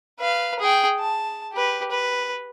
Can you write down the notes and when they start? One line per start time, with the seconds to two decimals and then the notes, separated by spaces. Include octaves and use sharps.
0.20 B4 F5
0.60 G#4 G5
0.99 A5
1.53 G4 B4
1.91 B4